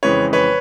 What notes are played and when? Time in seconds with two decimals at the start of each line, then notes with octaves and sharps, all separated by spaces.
0.03 F2 C#3 E3 G#3 B4 C#5
0.33 B4 C#5